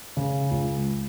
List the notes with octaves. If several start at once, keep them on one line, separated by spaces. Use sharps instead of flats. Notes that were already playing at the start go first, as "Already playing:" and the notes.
C#3
C#2